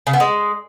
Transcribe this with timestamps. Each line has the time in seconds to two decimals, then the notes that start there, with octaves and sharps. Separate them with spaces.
0.07 C#3
0.13 B3
0.20 G#3